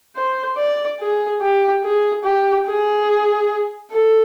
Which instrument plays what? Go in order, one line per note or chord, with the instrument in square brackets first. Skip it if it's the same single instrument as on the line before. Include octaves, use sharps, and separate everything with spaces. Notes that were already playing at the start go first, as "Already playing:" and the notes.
[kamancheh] C5
D5
G#4
G4
G#4
G4
G#4
A4